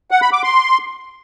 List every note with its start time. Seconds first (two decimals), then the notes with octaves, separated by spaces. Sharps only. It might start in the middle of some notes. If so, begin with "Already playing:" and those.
0.11 F#5
0.22 B5
0.33 D6
0.43 C6